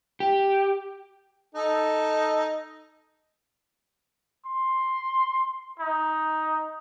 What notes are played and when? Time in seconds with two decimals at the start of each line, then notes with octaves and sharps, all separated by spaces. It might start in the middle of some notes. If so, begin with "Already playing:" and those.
0.20 G4
1.55 D#4 A4
4.46 C6
5.80 D#4